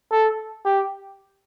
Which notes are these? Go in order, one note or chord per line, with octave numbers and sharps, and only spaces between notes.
A4
G4